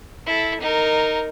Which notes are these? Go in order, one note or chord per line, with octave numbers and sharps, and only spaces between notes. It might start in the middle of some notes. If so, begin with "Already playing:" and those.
E4 A4
D#4 A#4